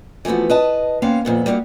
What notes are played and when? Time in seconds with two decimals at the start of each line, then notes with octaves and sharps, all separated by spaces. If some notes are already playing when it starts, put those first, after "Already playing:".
0.25 E3 F3 A3 B3 F#4
0.50 B4 D#5 A5
1.02 A#3 B3 C#4 C5 F5 G5
1.25 F2 A#2 B3
1.46 G3 A#3 B3 D#4 F#4